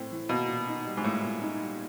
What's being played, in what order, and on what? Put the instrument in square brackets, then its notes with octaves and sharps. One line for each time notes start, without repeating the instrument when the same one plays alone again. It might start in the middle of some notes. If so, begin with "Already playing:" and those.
Already playing: [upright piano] A2 A3 C4
E3
[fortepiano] B2 [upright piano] A#3
[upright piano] A#2
D#4
G3
[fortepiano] G#2
[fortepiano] A2 [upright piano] A#3
[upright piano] A#2
D#4
G3